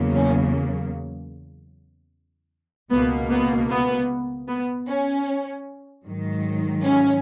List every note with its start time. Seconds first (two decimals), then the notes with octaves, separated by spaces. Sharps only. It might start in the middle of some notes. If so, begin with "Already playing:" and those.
Already playing: E2 C#3 F#3 A#3
0.15 C#4
2.90 C#2 B2 A#3 B3
3.30 B3
3.69 B3
4.48 B3
4.88 C#4
6.05 G#2 D#3 F#3
6.84 C#4